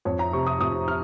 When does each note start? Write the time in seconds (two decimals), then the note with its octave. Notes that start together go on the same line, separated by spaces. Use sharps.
0.05 F2 C#5
0.19 A#5
0.33 C3 C#6
0.47 D#6
0.60 F2 D#6
0.88 F6